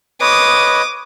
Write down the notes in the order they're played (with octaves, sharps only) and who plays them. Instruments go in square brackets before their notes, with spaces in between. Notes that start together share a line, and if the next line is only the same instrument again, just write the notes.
[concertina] B4 C#5 D#5 [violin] D6 D#6